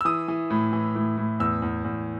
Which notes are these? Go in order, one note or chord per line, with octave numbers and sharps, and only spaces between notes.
E6
E3 D#6
E3
A2
E3
A2
A2
E2 E6
E2
E2